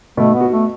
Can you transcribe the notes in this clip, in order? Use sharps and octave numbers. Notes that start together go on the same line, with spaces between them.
B2 A3
B3
F#4
A3